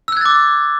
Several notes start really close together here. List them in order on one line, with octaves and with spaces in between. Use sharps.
E6 F#6 G#6 A6 D6